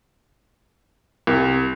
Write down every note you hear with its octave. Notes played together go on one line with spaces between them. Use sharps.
C2